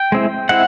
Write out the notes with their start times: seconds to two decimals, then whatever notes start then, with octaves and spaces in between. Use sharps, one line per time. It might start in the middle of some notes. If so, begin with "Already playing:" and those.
Already playing: G5
0.12 G#3 C4 E4
0.49 G#3 C4 E4 F#5